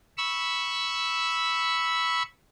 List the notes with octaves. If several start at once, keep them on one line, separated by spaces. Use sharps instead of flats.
B5 C#6 E6